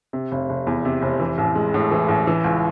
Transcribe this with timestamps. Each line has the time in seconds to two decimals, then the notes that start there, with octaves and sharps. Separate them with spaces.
0.13 C3
0.31 F1
0.49 F1
0.67 E2
0.85 C3
1.02 F1
1.20 E3
1.38 A1
1.55 G#3
1.74 A2
1.91 E3
2.08 A1
2.27 E3
2.44 C#2